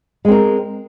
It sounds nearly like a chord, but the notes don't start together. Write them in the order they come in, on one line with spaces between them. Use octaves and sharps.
G#3 C4 A#4